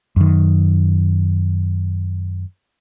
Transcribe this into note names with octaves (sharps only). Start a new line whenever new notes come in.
F#2 D#3